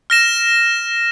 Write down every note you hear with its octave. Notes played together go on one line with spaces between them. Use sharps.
F6 A#6 E7